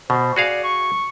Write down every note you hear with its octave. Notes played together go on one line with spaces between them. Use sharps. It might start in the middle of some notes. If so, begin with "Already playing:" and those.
B2 C5
F#4 G#4 D5 F5
C#6